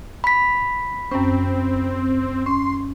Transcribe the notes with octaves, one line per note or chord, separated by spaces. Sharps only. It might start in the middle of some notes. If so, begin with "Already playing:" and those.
B5 B6
F#2 C4 C#4
C#4 C6